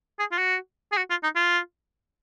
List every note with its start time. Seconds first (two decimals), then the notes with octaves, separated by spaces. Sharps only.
0.19 G#4
0.32 F4
0.38 F#4
0.92 G#4
0.97 F#4
1.10 F4
1.23 D#4
1.35 F4